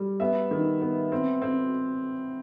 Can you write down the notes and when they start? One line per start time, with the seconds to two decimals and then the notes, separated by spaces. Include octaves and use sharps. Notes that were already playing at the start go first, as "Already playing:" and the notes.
Already playing: G3
0.20 B3 E5
0.51 D#3
0.81 B3
1.12 C4
1.42 C4